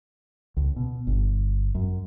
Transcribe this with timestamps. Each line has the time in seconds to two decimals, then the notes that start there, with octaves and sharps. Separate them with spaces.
0.57 C#2
0.76 B2
1.07 G1
1.75 F#2